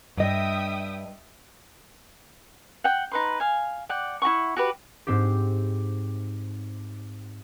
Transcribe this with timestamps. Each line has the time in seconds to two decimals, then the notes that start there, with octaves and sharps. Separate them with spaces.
0.17 G2 D#5 E5 G5 D#6
2.84 F#5 G5
3.12 D#4 B4 C6
3.40 F5 G#5
3.89 D5 F#5 G5
4.22 E4 F#4 F#5 C#6
4.56 F#4 G4 B4
5.07 G#2 C4 G4